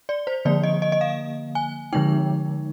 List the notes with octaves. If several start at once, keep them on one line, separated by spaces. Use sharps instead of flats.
D5
C5
D3 F3 A#3 D5
D#5
D#5
D#5
F5
G#5
D3 F3 G#3 D#4 G5